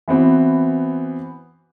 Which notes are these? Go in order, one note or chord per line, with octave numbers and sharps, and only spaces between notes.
E3 B3 C4 F#4